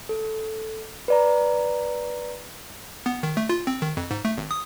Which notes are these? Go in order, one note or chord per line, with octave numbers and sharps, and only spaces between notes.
A4
B4 D5 A#5
B3
D#3
A3
F4
C4
D#3
F2
G#2
A3
G#1
D#6